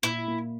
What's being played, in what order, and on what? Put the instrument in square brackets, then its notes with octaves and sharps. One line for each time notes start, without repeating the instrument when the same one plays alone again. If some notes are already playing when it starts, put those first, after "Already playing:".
[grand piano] A#2 [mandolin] E4
[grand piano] A#3